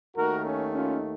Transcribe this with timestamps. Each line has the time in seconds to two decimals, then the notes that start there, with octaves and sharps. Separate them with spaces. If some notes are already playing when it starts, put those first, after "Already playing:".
0.15 D#2 D#3 A3 F#4 A#4
0.43 C#4
0.72 C#4 F4